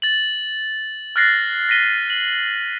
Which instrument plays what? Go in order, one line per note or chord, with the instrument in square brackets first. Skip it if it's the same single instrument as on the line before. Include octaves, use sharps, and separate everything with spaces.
[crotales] A6 F#7
F6 F#6 A6 A#6 C7
A#6 B6 D#7 G7
F#7